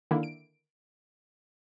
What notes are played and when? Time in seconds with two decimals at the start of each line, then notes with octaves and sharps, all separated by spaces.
0.11 D3 D#3 A#3 E4
0.23 D7